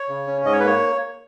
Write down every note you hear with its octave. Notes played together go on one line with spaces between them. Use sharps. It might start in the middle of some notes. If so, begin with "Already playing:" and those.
Already playing: C#5
C#3
C#4
G#2 D#5
C#5
B4
A#3 C#5